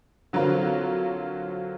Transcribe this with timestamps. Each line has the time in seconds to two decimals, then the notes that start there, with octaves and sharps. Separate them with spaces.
0.33 D3 F#3 C4 F4 A#4